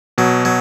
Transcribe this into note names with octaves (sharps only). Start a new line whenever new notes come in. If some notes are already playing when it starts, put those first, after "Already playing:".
B2 F#3
F#3